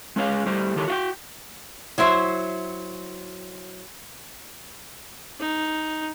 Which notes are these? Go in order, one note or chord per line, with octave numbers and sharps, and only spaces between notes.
G#3 C#4 G#4 C#5 F5
G3 A3 G4 C5
D#3 G4 A4 A#4 C#5
F#4 F5 G5
F#3 E4 C5 E5
D#4